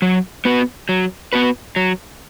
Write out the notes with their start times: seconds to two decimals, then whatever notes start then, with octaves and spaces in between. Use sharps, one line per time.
0.02 F#3
0.45 B3 F#4 B4
0.89 F#3
1.33 B3 F#4 B4
1.76 F#3